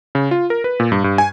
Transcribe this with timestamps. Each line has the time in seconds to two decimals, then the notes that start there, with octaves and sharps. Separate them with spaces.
0.15 C#3
0.31 F4
0.50 A#4
0.64 B4
0.80 A#2
0.92 G2
1.04 G2
1.18 G#5